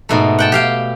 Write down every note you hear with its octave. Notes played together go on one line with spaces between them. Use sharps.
G#2 B2 A3
F#5 G5 A5
G4 F5 G5